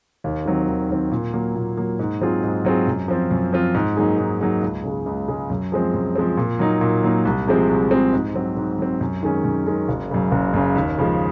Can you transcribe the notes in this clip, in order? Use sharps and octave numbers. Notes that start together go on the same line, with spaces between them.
D#2
D#3 F#3 C4
D#2
D#3 F#3 C4
A#2
F#3 A#3
A#2
F#3 A#3
G#2
F#3 C4 F4 G#4
G#2
F#3 C4 F4 G#4
F#2
F3 C4 F4
F#2
F3 C4 F4
G#2
F#3 A#3 D#4 G#4
G#2
F#3 A#3 D#4 G#4
C#2
C#3 G#3
C#2
C#3 G#3
F#2
F3 G#3 C4
F#2
F3 G#3 C4
A#2
F#3 A#3 D#4
A#2
F#3 A#3 D#4
C2
C3 F3 G#3 C4
C2
C3 F3 G#3 C4
G#2
F#3 C4
G#2
F#3 C4
F#2
D#3 G#3 C#4
F#2
D#3 G#3 C#4
F#1
F#2 C#3
F#1
F#2 C#3
D#2
C#3 F3 G#3